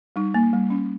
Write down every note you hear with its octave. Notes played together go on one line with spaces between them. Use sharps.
G3 D#4
A#3
G3
C#4